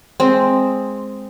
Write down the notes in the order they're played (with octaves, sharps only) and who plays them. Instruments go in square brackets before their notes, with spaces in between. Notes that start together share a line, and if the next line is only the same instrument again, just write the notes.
[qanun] G#3 C4